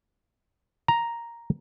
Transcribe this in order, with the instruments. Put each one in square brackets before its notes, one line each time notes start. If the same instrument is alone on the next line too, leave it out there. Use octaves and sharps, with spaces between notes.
[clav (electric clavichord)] A#5